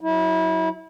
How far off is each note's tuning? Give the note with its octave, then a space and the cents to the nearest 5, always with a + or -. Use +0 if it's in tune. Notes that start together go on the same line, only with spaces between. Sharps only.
F#3 +0 E4 -25